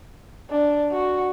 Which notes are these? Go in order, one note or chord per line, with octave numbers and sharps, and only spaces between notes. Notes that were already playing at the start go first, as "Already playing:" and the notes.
D4
F#4